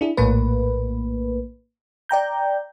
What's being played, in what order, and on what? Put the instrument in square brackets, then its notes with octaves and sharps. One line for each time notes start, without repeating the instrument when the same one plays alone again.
[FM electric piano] D4 E4 G#4
A#1 A2 A#3 B4
D5 G5 A#5 G6